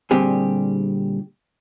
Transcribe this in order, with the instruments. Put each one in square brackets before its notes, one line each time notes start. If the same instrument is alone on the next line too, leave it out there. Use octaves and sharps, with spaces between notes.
[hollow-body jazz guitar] A#2 D3 G3 C4 G4 G#4